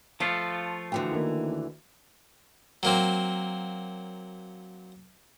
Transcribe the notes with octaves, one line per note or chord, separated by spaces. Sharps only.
F3 A3 F4 A5
D2 D3 E3 G5
D#3 A#3
F#3 A#3 C4